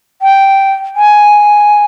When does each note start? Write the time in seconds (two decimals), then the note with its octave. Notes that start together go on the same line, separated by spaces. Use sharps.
0.22 G5
0.96 G#5